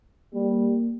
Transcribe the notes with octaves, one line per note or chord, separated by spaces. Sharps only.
G3 A#3